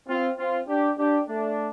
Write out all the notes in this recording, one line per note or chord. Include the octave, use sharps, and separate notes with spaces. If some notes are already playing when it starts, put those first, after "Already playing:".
C4 F4
C4 F4
D4 G4
D4 G4
A3 D4